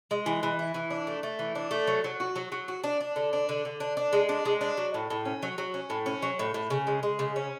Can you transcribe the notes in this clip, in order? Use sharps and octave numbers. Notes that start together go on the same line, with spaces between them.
G#3
E3
E3
E4
E3
D4
A3
A3
E3
D4
A3
F#3
F#3
F#4
F#3
F#3
F#4
D4
D4
D3
D4
D3
D3
D4
D4
G#3
D4
G#3
D4
F#3
A2
A2
C#4
F#3
F#3
C#4
A2
C#4
F#3
A2
A2
C#3
G#3
G#3
C#3
C#4